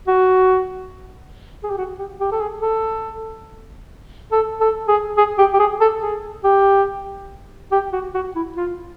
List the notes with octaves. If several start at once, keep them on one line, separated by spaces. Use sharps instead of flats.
F#4
G#4
G4
F#4
G4
G4
A4
G#4
A4
A4
A4
G#4
G#4
G4
G4
G#4
A4
G#4
G4
G4
F#4
F#4
E4
F4